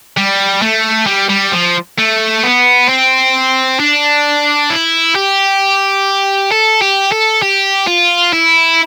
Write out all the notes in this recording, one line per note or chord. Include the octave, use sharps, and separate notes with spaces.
G3
A3
G3
G3
F3
A3
B3
C4
D4
E4
G4
A4
G4
A4
G4
F4
E4